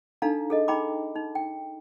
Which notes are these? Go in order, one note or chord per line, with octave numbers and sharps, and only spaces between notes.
D4 D#4 A4 F5 A#5
G#4 A4 D#5
D#4 G#4 G5 A#5 B5 D6
D#4
G5